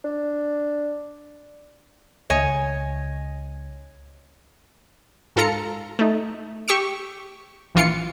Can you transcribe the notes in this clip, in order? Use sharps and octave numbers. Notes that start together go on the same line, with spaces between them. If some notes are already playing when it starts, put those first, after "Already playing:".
D4
C#2 C#5 D#5 G#5
G#2 F4 A4 A#5 C#7
A3 D#4
G4 C#6 E6 C#7
A#1 E3 F4 C7 C#7